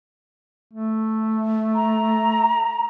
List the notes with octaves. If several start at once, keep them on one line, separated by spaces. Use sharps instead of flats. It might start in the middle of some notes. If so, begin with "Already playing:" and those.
A3
A#5